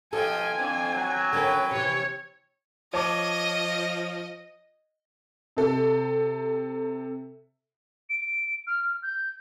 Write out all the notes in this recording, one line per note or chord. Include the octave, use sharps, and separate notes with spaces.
B1 F3 A4 D#5 G5 G#5
F2 C4 D4
F#3
D3 A#3 C#4 B4 G5
C3 E3 C#5
F3 C#5 D#5 A5 D6
C3 A4
D7
F6
G6